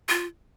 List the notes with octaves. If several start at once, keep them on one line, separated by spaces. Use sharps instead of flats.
F4